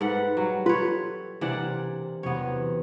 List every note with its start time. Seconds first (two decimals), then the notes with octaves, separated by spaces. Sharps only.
0.01 G#2 A4 B4 F#5
0.37 F#3 G3
0.66 F4 A4 B4 C#5
1.41 C3 E3 A#3 D4 D5 F#5
2.23 E2 C3 F#3 B3 C#5